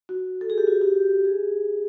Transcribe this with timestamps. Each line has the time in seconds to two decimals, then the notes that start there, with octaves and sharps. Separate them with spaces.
0.09 F#4
0.41 A4
0.50 G#4
0.58 G4
0.67 F#4
0.81 G4
1.25 G#4